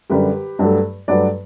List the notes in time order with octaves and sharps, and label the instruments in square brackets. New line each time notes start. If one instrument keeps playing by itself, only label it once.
[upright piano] F#2 D3 G3 G4 B4
G2 F#3 A3
G2 F#3 A3 B4 D5